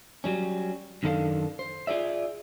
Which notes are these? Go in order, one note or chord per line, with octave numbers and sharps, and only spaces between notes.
F#3 G3 C#4
F#2 D#3 D4 E4 A4 F5
C5
F4 G#4 D5 E5